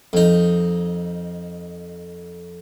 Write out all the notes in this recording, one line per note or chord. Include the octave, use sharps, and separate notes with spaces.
F2 D#4